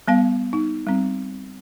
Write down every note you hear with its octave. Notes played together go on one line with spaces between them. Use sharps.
G3 B3 F5
D#4
G3 C4